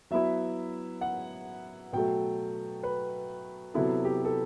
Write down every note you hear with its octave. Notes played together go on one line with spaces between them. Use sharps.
F#3 B3 E4 E5
F#5
B2 F#3 A3 G5
B4
C3 F#3 B3 E4 A4
G4
A4